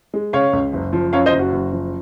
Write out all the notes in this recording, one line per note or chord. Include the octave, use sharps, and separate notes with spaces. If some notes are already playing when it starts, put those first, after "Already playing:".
G#3
C#3 C#5 F5
C#2
F#1
F3
F#2 C#5 F5
C5 D#5
F#1
F#4
F#1
F3